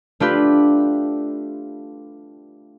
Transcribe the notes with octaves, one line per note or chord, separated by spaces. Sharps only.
A3 D4 F4 G4 B4